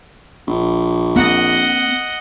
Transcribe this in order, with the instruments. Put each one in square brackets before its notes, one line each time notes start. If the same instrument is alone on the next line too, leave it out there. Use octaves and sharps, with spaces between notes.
[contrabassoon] A#1
[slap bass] A#3 C4 [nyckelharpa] D#5 F#5